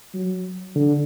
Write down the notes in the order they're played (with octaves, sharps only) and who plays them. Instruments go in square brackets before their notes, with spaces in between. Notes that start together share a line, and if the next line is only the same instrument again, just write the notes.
[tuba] F#3
D3